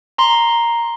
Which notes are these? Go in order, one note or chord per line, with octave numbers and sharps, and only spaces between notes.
A#5 C6